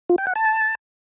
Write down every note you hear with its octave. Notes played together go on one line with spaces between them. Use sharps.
F4
G5
F#5
A5